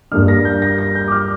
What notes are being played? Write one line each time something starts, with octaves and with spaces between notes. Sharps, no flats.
G2 G3 A#3 D4 F6
A#6
G6
A#6
A#6
G6
D6
F6